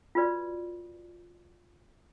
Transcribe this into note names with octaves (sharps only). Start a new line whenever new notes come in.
F4 F#4 B4 D5